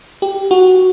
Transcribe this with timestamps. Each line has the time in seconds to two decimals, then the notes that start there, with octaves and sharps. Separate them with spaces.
0.22 G4
0.51 F#4